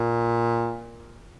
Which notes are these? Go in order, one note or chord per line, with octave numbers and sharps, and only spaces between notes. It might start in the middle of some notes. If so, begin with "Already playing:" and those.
Already playing: A#2